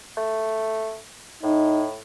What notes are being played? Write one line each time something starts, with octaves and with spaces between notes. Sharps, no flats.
A3
A2 D#4